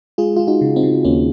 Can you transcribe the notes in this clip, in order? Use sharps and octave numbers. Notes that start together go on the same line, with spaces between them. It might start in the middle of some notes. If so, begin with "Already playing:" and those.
G#3 F4 G#4
G#3 F4
D#4 F#4
C#3
C4 D#4
C#3
D#2 A#3 C#4